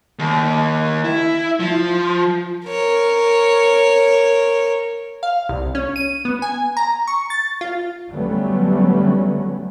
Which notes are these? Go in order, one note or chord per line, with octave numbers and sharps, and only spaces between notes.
D#2
E4
F3
A#4 C#5
F5
C2
C#4
D#7
B3
G#5
A#5
C#6
A6
F4
D3 F#3 G3 A3 B3 C#4